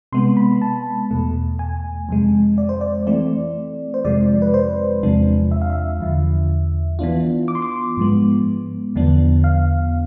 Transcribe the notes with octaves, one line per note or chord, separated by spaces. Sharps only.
C3 G#3 B3 C6
B5
A5
E2 B2 A3
G#5
F2 C3 G#3
D5
C5
D5
E3 A3 C4 D5
C5
F2 C3 F3 G#3 D5
B4
C5
E2 C3 F3 G#3 D4
E5
F5
E5
E2 D3 F3
E3 B3 D4 F4
D6
C6
D6
G#2 F3 G#3 B3
E2 D3 F3 B3 D4
F5